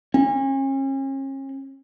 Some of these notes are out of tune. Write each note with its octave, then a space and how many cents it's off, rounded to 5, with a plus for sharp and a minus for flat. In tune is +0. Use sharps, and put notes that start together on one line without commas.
C#4 -40